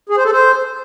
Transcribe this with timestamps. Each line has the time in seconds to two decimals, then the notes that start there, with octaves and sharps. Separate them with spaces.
0.09 G#4
0.17 C5
0.25 A4
0.32 C5